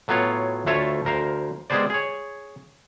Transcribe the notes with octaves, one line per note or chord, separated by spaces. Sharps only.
A2 F#3 B3 F4 C#5
D2 A3 F4 C#5 E5 A5
D2 A#4 C5 F5
G3 G#3 B3 G#4 C5 D5
G#4 C#5